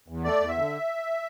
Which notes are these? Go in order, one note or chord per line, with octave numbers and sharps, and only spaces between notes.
E2
A3 D5
E2
E5
D3